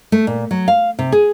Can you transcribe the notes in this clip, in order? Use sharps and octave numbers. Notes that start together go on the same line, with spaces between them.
A3
A#2
F#3
F5
C3
G#4